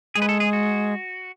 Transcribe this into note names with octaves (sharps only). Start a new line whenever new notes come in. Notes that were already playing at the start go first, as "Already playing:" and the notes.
G#3 G#4
B4
A4
G#4
F#4